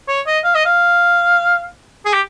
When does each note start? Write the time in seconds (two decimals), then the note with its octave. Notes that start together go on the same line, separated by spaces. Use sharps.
0.08 C#5
0.27 D#5
0.44 F5
0.55 D#5
0.66 F5
2.05 G#4
2.13 G4